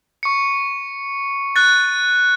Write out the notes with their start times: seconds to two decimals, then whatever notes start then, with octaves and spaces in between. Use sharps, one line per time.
0.23 C#6 C#7
1.56 F#6 A6